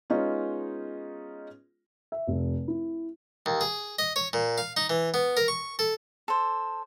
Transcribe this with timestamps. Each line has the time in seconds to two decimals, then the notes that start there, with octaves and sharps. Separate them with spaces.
0.10 G#3 B3 C#4 D#4 F4
2.12 E5
2.27 F1
2.68 E4
3.46 D#2
3.61 G#4
3.99 D#5
4.16 C#5
4.33 A#2
4.58 F5
4.77 D#4
4.89 E3
5.14 B3
5.37 A#4
5.48 C#6
5.79 A4
6.28 A4 C5